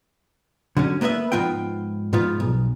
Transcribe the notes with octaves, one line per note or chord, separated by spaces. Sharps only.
D3 F#3 C#4
A#3 B3 B4 C#5 E5
G#2 F3 B3 F4 G5
G#2 F3 B3 F4
B1